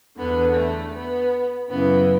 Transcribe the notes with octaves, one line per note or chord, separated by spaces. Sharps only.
E2 D3 B3
A3
B3
F#2 C#3 E3 B3